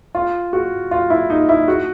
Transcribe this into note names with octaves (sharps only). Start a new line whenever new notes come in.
F4
F#4
F4
E4
D#4
E4
F#4